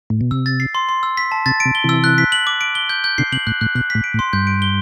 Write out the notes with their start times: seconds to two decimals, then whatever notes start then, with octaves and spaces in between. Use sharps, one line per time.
0.10 A2
0.21 B2
0.31 C3 E6
0.46 A6
0.60 C7
0.75 C6
0.89 C6
1.03 E6
1.17 B6
1.32 A5
1.46 C3 A6
1.60 D7
1.65 C3
1.75 G7
1.84 C3 E3 E6
2.04 F#6
2.18 B6
2.32 F#7
2.47 D6
2.61 D7
2.75 G7
2.89 G6
3.04 G6
3.18 B2 D3 C7
3.32 C3 F#7
3.47 A2 F#6
3.61 A2 F#6
3.75 B2 F#6
3.90 B6
3.95 A2
4.04 D7
4.14 A2
4.19 C6
4.33 G2 G6
4.47 D7
4.62 G7